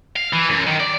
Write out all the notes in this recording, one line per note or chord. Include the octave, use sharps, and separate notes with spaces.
F5
E3
F#2
D#3
D5